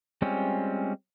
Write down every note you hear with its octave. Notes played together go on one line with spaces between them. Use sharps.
G3 G#3 C4 C#4 F4